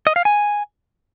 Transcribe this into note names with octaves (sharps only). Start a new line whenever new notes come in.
D#5
F5
G#5